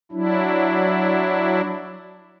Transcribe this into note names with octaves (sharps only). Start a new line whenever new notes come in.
F#3 D4 E4